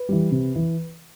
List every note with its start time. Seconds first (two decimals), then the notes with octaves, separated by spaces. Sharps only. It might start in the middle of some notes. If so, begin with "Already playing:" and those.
Already playing: B4
0.09 E3 G3
0.32 C3
0.56 E3